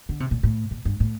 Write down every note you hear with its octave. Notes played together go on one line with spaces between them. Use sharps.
D3
C3
A#2
A2
A#2
G2
A2